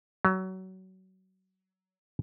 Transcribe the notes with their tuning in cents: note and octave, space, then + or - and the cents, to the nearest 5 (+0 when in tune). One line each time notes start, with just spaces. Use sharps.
F#3 +25